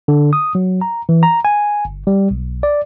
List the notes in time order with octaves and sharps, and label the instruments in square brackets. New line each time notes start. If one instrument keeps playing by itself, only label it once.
[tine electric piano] D3
D#6
F#3
A#5
E3
A#5
G#5
G1
G3
B1
D5